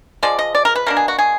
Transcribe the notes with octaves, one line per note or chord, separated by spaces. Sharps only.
F3 G#3 D5
D#5
D5
A#4
B4
B2 A#3 D4 A#4
G#4
F#4
G#4